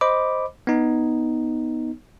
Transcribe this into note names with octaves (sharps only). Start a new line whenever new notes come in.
C5 D#5 B5 D6
B3 D#4